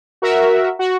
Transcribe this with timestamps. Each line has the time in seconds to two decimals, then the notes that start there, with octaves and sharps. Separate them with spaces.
0.22 F#4 A#4 E5
0.79 F#4